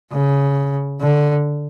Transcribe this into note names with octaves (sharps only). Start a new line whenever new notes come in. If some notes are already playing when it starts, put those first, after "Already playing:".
C#3
D3